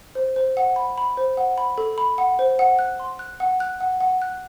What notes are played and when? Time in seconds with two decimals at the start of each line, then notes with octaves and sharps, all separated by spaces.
0.15 C5
0.36 C5
0.57 F#5
0.76 B5
0.98 B5
1.17 C5
1.37 F#5
1.58 B5
1.78 A4
1.98 B5
2.18 F#5
2.39 C5
2.59 F#5
2.79 F#6
3.00 C6
3.19 F#6
3.40 F#5
3.60 F#6
3.80 F#5
4.01 F#5
4.22 F#6